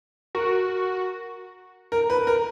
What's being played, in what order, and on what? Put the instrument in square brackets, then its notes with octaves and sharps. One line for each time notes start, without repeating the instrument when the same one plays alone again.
[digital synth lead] F#4 [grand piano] A#4
[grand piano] A#4
B4
A#4